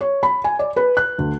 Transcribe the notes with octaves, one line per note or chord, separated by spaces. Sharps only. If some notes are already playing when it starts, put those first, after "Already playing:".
C#5
B5
G#5
D5
B4
F#6
D2